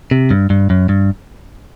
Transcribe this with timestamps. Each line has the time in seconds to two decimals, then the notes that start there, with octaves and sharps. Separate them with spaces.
0.11 C3
0.31 G2
0.50 G2
0.70 F#2
0.89 G2